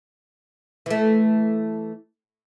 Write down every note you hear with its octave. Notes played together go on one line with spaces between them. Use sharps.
E3 A3